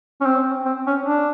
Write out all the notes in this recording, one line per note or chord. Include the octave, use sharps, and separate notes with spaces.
C#4
C4
C4
C#4
D4